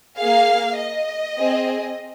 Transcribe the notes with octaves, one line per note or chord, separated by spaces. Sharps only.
A#3 G#4 F5
D#5
C4 G#4